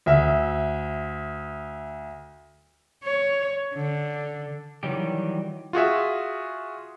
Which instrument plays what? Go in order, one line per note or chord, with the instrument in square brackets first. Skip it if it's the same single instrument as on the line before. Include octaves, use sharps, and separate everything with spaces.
[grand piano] D2 E5
[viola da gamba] C#5
D3
[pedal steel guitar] D#3 E3 F#3 G3 G4
[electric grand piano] F4 F#4 G#4 E5